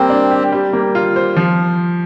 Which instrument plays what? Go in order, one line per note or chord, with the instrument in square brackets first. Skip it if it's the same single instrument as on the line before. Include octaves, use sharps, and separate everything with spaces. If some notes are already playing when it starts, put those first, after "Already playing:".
Already playing: [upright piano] G3 A#3 [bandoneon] C4
[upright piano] D4
G4
G3
A#3
F4
C5
F3